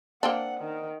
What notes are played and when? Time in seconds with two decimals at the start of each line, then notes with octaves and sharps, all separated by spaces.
0.23 A#3 C4 D4 F#5
0.60 D#3